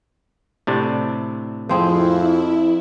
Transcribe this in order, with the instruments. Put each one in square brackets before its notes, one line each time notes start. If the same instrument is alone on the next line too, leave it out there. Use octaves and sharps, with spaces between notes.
[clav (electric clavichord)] A2 C3 D4
[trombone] F2 [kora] F3 C4 G#4 [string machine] E4